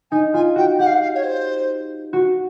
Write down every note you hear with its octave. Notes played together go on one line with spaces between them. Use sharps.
D#4 G#5
F4 G#5
F#4 G5
G4 F#5
F5
F#5
F5
C#5
C5
F#4